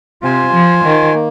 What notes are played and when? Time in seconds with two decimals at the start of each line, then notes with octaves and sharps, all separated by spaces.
0.22 C3 F4 C5 G#5
0.53 F3
0.84 D#3
1.14 A#3